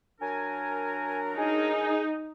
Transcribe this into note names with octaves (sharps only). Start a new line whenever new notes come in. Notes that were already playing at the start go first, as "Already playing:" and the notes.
F#3 D4 A#4 G#5
D#4 G#4